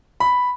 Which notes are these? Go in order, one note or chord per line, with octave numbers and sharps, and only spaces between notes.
B5